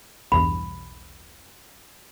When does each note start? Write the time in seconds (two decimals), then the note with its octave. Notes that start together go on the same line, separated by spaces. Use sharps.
0.32 B1 E2 G2 B5